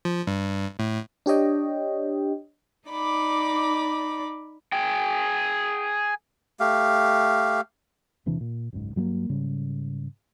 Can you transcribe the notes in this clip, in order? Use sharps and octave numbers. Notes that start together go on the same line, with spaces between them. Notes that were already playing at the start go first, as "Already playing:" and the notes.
F3
G2
A2
D4 G4 C#5 D#5 G5
D#4 D5 B5 D6
G#4 G5
A3 G4 F5
E1 C3 E3 D4
A#2
F#1 C#2 G#2
G2 F#3 A3 A#3
G#2 C#3 G3